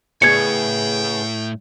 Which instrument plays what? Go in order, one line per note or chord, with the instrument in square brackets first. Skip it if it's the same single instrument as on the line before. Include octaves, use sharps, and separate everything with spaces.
[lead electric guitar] A2 [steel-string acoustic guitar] C#3 B3 G#4 [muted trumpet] G5 [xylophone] G#6 C#7